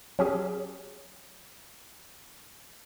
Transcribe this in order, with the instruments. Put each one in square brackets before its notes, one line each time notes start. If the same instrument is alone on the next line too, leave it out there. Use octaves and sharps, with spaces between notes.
[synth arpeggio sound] F#3 C#4 G4 G#4